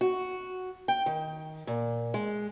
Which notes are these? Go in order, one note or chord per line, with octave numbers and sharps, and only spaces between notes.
F#4
G5
D#3
A#2
G#3